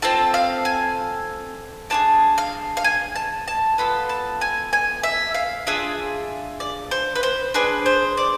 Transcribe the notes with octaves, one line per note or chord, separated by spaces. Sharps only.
C4 F4 A4 A5
F5
G#5
D4 F4 G#4 A5
F5
F5
G#5
A5
A5
B3 F4 A4 B5
A5
G#5
G#5
E5
F5
D4 F4 G#4 E5
D5
C5
B4
C5
D4 G#4 B4
C5
D5